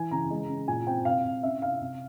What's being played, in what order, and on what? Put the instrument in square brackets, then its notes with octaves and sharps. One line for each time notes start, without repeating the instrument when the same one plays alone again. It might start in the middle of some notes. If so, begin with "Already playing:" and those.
Already playing: [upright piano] E3 G#5
C#3 A#5
G#3
C#4
A#2 G#5
C4 G5
C3 F5
C3
C#4 E5
C3 F5
C3